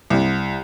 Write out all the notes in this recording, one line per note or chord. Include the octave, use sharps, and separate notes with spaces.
C2